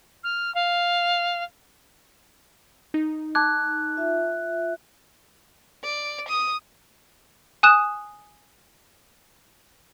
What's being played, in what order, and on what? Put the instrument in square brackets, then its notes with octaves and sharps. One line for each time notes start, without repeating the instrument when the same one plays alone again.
[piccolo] F6
F5
[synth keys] D#4
[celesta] A5 D6 G#6 [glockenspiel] F#6
[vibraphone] F4 E5
[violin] D5
D#6
[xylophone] G#5 D#6 F#6 E7